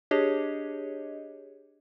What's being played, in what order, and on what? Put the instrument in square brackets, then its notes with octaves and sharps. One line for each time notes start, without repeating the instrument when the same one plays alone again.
[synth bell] D4 G4 G#4 C#5 D#5